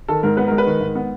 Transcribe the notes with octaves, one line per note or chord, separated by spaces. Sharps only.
D#3 A4
G#2 A#4
B3 B4
G#3 A#4
B4
D#3
G#2
B3